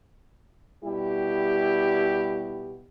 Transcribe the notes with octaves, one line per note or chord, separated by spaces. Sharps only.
B2 G3 E4 G4